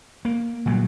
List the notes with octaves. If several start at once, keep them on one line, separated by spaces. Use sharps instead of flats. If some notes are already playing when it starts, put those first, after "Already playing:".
A#3
A#2 F#3 G3